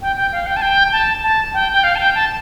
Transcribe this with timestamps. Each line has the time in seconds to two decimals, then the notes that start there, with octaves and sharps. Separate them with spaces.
0.02 G5
0.16 G5
0.32 F5
0.46 G5
0.56 A5
0.62 G5
0.92 A5
1.23 A5
1.54 G5
1.73 G5
1.84 F5
1.95 A5
1.99 G5
2.15 A5